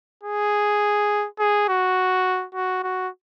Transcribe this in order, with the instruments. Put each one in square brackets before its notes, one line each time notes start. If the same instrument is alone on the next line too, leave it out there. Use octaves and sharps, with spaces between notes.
[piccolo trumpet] G#4
G#4
F#4
F#4
F#4